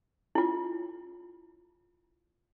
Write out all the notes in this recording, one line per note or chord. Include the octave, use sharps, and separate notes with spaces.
E4 F4